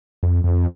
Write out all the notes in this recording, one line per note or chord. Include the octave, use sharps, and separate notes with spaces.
F2
F2